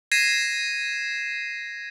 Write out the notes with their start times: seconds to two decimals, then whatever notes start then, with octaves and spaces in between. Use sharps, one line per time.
0.12 G#6 A#6 C7 D#7 E7